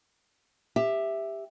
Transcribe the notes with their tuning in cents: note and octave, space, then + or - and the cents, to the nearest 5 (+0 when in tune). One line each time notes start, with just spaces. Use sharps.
G4 +15 E5 +0